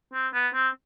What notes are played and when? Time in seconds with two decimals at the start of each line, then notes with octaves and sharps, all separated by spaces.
0.13 C4
0.34 B3
0.54 C4